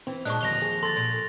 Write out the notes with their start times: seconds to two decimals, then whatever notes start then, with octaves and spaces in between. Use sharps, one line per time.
0.07 E3 C4
0.25 A#2 G#3 D4 D#5 C#6 F#6
0.41 D#2 D3 F3 A#6 F7 G7
0.62 G#4
0.83 A4 C6 A6
0.96 A#2